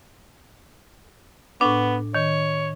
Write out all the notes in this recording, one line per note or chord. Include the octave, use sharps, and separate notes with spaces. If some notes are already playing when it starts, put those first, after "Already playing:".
A2 B3 D4
D#3 C#5